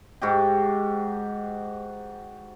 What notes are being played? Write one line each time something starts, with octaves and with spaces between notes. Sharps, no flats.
G#2 F#4 G4